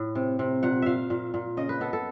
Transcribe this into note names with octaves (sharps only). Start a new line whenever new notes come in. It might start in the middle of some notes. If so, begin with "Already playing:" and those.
Already playing: A2
C3
C3
A#2 F#5
A#2 E5 F5
A#2
A#2
C#3 D#5
B4
B3 A4
A4